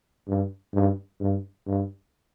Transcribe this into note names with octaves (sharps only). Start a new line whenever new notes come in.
G2
G2
G2
G2